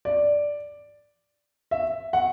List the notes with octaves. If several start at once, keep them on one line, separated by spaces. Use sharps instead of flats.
D5
E5
F#5